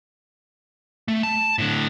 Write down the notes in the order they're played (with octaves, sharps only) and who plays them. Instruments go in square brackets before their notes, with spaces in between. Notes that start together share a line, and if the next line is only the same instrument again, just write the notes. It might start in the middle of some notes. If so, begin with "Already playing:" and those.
[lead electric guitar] A3
A5
A2 D3